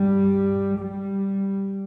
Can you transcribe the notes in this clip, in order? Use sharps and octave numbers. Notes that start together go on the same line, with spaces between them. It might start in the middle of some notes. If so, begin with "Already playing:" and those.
Already playing: G2 G3
G3